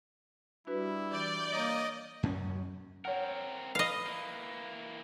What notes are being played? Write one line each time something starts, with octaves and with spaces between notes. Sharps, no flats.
G3 D4 E4 F#4 B4
E3 D5 G6
A#3 C#5 D#5 A#5 D6
F#2 C#4
C4 A#4 C#5 F#5
B4 D#5 F5
E3 A#3